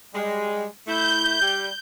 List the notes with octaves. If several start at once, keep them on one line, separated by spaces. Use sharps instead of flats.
G3 G#3
A2 A3 E4 G6
G3